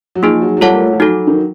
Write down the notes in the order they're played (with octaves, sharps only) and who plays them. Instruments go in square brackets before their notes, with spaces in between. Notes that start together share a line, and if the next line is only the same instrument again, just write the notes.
[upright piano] F#3
[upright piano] F3 [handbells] A#3 D#4 G#4
[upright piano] F#3
F#3
[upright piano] G3 [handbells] F4 A4 C#5 F#5 A5
[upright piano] A#3
A3
F3
[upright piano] F#3 [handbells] D#4 F#4 A4
[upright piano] D#3